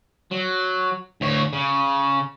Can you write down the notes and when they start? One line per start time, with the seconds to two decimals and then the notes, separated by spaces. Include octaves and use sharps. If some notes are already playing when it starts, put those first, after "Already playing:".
0.32 F#3
1.21 D2 C#5
1.53 C#3